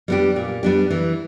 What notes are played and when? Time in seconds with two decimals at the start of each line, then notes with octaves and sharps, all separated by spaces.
0.08 G3 B3 D4 G4
0.36 A#2
0.63 G3 B3 D4 G4
0.91 E3